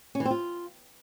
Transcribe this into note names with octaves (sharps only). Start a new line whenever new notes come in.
C#4
E3
C4
F4